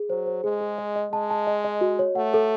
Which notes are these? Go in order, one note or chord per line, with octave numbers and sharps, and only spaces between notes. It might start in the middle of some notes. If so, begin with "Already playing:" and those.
Already playing: G#4
F#3 C5
C5
G#3 G#4
G#4
D#5
D#5
G#3 A5
A5
D#5
D#5
F#4
C#5
A3 F#5
A4